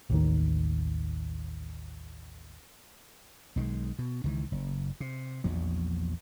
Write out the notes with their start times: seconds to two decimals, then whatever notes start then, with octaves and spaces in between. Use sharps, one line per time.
0.10 A1 D#2 D#3
3.56 B1 D#3 G3 G#3
3.99 B2
4.24 C#2 D#3 E3
4.52 F#1
5.00 C3
5.44 A#1 E2 F3 F#3